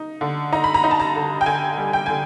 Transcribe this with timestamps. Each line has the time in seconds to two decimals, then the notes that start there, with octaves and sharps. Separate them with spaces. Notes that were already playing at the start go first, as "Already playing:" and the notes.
Already playing: D#4
0.21 D3
0.52 D#4 A#5
0.64 B5
0.74 A#5
0.84 D#4
0.91 A5
1.00 A#5
1.16 D3
1.41 G5
1.46 D3 G#5
1.78 G3
1.93 G5
2.06 D3 G#5